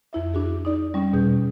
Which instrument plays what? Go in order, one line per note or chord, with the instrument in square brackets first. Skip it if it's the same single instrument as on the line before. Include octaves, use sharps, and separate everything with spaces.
[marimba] F2 E4 E5
D4 F#4 G#4
D#4 D5
G3 C#4
E2 B2 G#4 G6